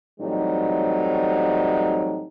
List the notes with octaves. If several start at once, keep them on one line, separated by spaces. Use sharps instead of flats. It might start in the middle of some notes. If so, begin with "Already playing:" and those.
A2 E3 F#3 G3 C4 D#4